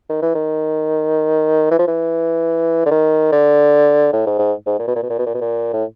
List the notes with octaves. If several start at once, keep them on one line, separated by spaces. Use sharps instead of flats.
D#3
E3
D#3
E3
F3
E3
D3
D#3
D3
A2
G#2
G#2
G#2
A#2
B2
A#2
B2
A#2
B2
A#2
B2
A#2
A2